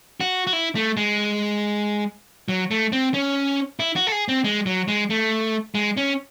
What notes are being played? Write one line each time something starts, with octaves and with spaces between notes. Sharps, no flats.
F#4
F#4
E4
A3
G#3
F#3
A3
C4
C#4
E4
F#4
A4
G#4
C4
G#3
F#3
G#3
A3
G#3
C#4